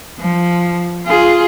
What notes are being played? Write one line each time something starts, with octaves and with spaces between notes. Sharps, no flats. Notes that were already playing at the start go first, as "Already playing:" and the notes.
F3
F4 G#4